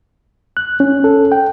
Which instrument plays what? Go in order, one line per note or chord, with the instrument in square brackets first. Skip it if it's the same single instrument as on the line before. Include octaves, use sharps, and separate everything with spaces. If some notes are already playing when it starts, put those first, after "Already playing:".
[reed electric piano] F#6
C#4
A4
G5